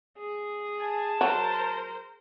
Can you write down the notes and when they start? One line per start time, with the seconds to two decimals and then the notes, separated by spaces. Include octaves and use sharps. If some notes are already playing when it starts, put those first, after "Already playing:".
0.18 G#4
0.80 G#5 A5
1.21 F#3 A#4 C5